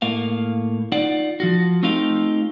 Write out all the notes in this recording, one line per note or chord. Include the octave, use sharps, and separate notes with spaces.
A2 A#3 F5
D#4 F4 D5 F#5
F3 F4 F#4
A3 C4 D#4 F4 G4 F5